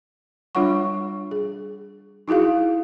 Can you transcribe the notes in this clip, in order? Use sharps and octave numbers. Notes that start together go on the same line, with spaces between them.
G3 D4 F4 C#5 F#5 C#6
G#4
D#4 E4 F#4 G#4 F5